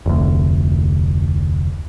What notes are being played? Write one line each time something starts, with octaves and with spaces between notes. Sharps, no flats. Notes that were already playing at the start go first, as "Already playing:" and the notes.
F1 D2